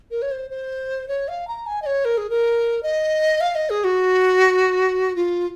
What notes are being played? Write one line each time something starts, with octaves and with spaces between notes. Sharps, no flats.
A#4
C#5
C5
C5
C#5
F5
A#5
G#5
D#5
C#5
A#4
G#4
A#4
D#5
F5
D#5
G#4
F#4
F4